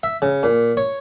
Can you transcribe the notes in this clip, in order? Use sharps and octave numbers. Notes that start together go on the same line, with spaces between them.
E5
C#3
A#2
C#5